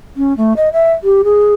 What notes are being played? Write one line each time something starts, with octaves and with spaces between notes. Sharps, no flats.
C#4
A3
D#5
E5
G4
G#4